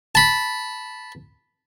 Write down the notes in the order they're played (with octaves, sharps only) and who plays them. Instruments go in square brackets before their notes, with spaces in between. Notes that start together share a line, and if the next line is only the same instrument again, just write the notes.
[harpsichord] A5 B5